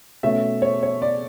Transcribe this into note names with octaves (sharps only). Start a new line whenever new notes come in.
B2 A3 C#4 E5
C#5
C#5
D5